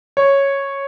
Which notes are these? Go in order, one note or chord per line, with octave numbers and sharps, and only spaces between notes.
C#5